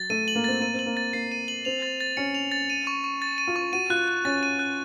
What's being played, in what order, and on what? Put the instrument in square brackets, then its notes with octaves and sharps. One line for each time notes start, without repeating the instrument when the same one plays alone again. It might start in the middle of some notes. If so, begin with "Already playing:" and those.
Already playing: [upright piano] F#3 [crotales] A6
[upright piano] A3 [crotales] D#7
[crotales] F#7
[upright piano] A#3
[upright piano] C4 [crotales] A6
[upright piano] A#3 [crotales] D#7
[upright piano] C4
[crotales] F#7
[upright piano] A#3
[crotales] A6
[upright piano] A#3 [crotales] C7
[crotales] D#7
F#7
[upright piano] C4 [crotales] F7
[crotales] A6
A6
[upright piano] C#4 [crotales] C#7
[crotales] F7
A6
D#7
C#6
C#6
A6
D#7
[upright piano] F4
[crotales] C#6
[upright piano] F#4 [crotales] D#7
[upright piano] F4 [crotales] F#6
[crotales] F#6
[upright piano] C#4 [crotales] A6
[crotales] D#7
F#6